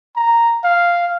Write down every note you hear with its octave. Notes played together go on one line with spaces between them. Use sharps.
A#5
F5